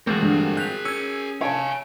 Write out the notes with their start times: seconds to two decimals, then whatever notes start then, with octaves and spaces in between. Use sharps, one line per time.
0.07 E3 G#3 A3 C4 F4 F#4 G#4 A#4
0.22 G2 D3
0.57 F#6 G6 B6 F7
0.85 C#4 E6 G#6
1.41 C#5 F5 G#5 A5